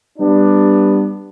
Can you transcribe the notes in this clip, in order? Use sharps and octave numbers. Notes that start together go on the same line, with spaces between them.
G3 B3 D4